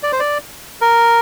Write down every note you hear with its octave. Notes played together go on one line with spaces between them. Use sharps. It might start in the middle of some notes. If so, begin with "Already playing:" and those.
D5
C5
D5
A#4